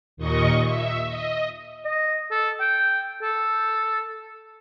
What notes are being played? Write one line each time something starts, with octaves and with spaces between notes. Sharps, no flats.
D#2 A#2 D#5 C#6
E5
D#5
D#5
A4
G5
A4